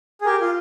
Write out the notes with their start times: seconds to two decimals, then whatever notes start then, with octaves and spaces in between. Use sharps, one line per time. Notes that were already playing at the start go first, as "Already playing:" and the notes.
0.21 G#4
0.25 G4 A#4
0.41 F4